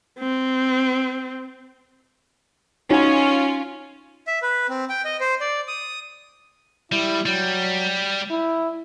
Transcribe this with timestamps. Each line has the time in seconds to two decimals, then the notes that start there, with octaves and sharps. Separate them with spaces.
0.19 C4
2.91 C#4 D#4 F4 F#4 C#5
4.27 E5
4.42 B4
4.69 C4
4.90 G5
5.05 D#5
5.21 C5
5.41 D5
5.68 D#6
6.92 G3 E4
7.26 F#3 G3
8.31 E4